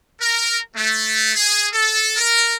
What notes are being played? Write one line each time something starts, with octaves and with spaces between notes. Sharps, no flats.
A#4
A3
G#4
A4
A#4